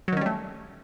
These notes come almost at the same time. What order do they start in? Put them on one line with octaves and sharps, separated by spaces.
F#3 D#3 C#4 G3 A3